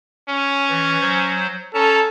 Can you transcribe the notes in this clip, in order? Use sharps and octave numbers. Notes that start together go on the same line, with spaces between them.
C#4
E3
F#3 C5
C#4 A4 A5 A#5